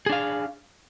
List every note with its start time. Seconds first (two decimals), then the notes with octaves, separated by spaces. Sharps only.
0.06 G#4
0.09 D4
0.12 F5